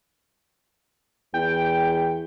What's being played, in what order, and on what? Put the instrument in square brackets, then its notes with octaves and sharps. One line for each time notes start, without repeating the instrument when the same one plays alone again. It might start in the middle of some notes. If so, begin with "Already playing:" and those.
[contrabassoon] E2 [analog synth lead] G5